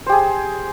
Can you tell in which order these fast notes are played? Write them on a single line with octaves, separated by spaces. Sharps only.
C5 G4 G#4